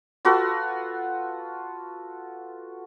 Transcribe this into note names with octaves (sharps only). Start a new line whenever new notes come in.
F4 F#4 A4 B4